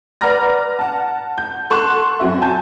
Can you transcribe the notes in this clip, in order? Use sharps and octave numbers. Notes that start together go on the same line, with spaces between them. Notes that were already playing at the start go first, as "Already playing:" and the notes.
B4 D5 F#5 A#5 F6 A#6
F#5 A5
G6
A4 F#5 C6 C#6 F#6 E7
F#2 C4 F#4 E5
G#5 A5 G6